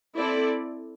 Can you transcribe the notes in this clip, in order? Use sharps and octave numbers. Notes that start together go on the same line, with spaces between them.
C4 E4 A4 D5